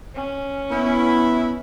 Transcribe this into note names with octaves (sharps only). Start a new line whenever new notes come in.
C#4
B3 E4